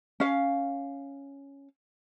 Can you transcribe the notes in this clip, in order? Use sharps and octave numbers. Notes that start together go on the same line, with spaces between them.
C#4 F5